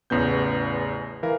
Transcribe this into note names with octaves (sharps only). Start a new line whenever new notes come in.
A1 E2 C#3 B3 G6
E3 A#4 F5